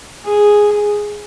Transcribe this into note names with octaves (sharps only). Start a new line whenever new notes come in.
G#4